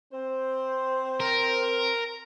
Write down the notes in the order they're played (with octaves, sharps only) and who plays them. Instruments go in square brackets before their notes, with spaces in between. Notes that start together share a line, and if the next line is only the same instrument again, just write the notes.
[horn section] C4 C5
[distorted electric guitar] A#4